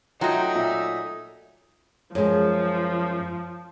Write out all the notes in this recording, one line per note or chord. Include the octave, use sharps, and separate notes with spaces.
F#3 A3 D#4 F4 G5 A#5
A#2 E5
F#2 F3 G#3